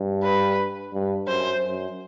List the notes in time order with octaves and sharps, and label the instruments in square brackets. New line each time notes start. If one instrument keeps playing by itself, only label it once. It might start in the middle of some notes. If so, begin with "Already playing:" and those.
Already playing: [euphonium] G2
[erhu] B4
[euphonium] G2
[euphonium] F#2 [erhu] C5
[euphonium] F#2